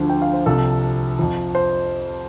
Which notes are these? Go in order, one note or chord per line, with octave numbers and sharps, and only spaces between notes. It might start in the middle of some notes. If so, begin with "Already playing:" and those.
Already playing: D2 D3 F3
G5
F5
C5
C2 C3 F3 A4
F2 F3
C5